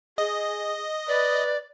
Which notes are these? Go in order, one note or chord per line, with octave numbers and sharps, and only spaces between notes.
G#4 D#5
B4 D5